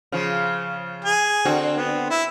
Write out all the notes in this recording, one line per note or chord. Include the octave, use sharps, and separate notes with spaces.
C#3 F3
G#4 G#5
D3 C4 F#4
B3
E4